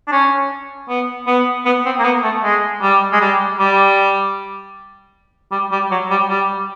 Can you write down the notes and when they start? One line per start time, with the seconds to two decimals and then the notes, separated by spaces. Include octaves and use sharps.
0.08 D4
0.12 C#4
0.89 B3
1.27 B3
1.65 B3
1.85 C4
1.99 A#3
2.04 B3
2.23 A3
2.43 G#3
2.82 G3
3.12 G#3
3.21 G3
3.59 G3
5.51 G3
5.72 G3
5.91 F#3
6.10 G3
6.30 G3